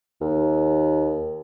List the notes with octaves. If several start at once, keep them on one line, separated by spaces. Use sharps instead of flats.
D#2